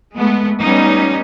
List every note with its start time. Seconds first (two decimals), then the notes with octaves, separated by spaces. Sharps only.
0.16 G#3 A3 B3
0.60 G3 B3 C#4 D#4